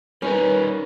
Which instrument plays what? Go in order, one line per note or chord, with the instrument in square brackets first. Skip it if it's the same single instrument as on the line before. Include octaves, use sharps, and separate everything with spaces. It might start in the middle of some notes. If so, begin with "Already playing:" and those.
[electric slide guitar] G3 D#4 A#4 [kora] C#4 [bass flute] B4